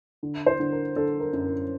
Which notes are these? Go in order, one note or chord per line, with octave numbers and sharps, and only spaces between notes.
D3
C5
D3
A#4
D3 A4
A#4
F#2
A#4